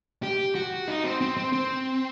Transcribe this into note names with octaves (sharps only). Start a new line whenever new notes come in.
G4
F#4
D#4
C4
C4
C4
C4